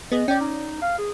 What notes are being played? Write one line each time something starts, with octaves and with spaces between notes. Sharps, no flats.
B3 G#4 D#5
C#4 D5 G5
D#4
F5
G#4